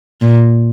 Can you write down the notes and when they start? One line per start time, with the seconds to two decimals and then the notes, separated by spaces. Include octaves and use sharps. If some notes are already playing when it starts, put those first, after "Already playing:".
0.21 A#2